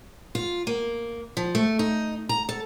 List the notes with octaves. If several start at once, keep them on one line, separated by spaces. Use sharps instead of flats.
F4
A#3
F3
A3
D#4
A#5
A4